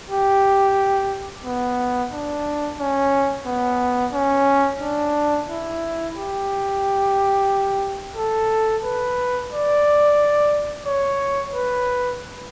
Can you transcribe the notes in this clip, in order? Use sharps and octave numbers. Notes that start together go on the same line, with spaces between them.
G4
B3
D4
C#4
B3
C#4
D4
E4
G4
A4
B4
D5
C#5
B4